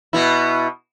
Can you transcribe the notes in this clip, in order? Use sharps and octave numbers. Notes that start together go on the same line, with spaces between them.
B2 B3 E4